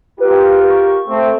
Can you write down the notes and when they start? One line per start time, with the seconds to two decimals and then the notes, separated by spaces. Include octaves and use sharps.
0.20 F4 G4 A#4 B4
0.70 C#6
1.09 A3 C4